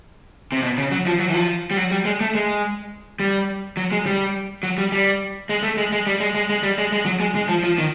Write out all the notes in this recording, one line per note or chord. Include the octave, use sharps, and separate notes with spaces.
C3
B2
C#3
F#3
F3
F#3
E3
F3
G3
F#3
G3
G#3
A3
G#3
G3
F#3
G#3
G3
F#3
G3
G3
G#3
A3
G#3
G#3
G3
G#3
G#3
G#3
G3
G#3
G#3
F#3
G#3
G#3
F3
F3
D#3